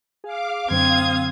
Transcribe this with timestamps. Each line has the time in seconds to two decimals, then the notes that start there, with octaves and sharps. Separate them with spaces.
0.24 G#4 F5 D6
0.71 F#2 D3 C4 F5 D#6 G#6